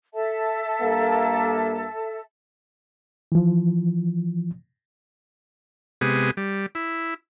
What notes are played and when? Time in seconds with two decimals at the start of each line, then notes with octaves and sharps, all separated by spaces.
0.14 A4 E5 A5
0.82 G2 A#3
3.32 E3 F3
6.01 C3 G#3 B3 G4 G#4
6.37 G3
6.75 E4